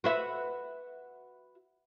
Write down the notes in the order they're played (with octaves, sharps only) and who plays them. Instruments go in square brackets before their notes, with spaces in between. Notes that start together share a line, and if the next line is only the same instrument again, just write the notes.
[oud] F#4 B4 E5